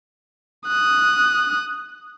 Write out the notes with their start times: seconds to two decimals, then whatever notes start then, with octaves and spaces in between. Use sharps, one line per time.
0.67 D#6 F#6